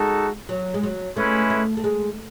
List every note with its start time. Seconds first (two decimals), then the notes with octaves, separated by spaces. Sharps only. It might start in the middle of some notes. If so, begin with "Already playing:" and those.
Already playing: G#3 D#4 F#4 A4
0.49 F#3
0.74 G#3
0.83 F#3
1.16 G#3 A3 C#4 E4 B4
1.50 A3
1.77 A3
1.84 G#3